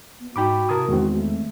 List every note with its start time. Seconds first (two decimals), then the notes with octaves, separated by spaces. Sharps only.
0.20 B3
0.36 G#2 D#4 F#4 G5 B5 D6
0.69 C3 E4 A#4 A5 D#6 G#6
0.89 E2 D#3 G#3 B3 C4
1.14 A3